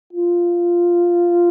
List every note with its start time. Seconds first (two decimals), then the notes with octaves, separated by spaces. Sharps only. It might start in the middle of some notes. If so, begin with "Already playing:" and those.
0.13 F4